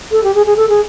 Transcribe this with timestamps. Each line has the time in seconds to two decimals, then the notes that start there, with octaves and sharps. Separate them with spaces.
0.11 A4
0.24 G4
0.35 G#4
0.46 G#4
0.57 A4
0.69 G#4